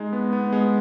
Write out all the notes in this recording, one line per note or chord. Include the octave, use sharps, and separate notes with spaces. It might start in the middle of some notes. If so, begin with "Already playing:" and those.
Already playing: G#3 D#4
B3
B3
G#3